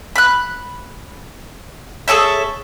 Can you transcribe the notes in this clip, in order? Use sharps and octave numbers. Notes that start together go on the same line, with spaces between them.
B5 F#6
G#4 A4 C#5 E5